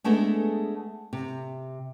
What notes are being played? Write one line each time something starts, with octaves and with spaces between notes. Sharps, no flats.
G#3 A3 B3 D4 G#4 A4
C3